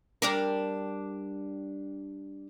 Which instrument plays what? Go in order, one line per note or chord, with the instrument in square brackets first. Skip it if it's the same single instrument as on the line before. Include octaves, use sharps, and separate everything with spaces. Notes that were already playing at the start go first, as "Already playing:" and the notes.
[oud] G3 D4 A#4